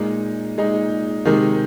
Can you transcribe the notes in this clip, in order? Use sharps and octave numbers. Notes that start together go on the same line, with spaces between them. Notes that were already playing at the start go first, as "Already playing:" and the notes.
Already playing: A#2 G#3 D#4
A#2 G#3 D#4
C3 D#3 G#3 D#4